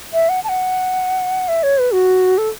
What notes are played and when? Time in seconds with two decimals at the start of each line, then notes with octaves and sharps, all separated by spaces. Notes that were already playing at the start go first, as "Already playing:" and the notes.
0.13 E5
0.29 F#5
0.44 A5
0.49 F#5
1.48 E5
1.63 C#5
1.79 B4
1.93 F#4
2.38 A4